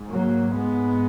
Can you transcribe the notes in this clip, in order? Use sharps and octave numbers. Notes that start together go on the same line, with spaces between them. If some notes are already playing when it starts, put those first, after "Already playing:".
Already playing: G#2
F#3 A#3
G#2 G#3 B3